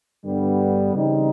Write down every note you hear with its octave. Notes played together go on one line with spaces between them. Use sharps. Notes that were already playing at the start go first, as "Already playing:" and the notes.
G2 D3 G3 B3
C#3 E3 G3 C4 D#4